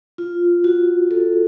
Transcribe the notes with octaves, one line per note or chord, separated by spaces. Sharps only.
F4
F#4
A4